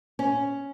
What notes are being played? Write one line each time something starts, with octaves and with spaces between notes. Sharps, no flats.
C#4